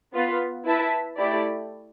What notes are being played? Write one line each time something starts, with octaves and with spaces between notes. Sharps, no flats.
B3 F4 B4
E4 B4 E5 A5
A3 E4 G4 D5